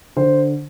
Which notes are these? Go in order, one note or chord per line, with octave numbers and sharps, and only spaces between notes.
D3 C5